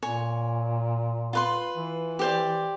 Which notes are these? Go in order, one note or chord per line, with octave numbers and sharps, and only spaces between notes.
A#2 C#5 G#5
F4 B4 C6
E3
G4 C5 D5